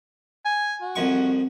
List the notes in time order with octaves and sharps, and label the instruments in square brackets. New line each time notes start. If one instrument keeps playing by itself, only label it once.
[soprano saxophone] G#5
F#4
[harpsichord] C2 F2 C#6